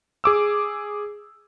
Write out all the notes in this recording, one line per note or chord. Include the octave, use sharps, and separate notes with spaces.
G#4 D6 E6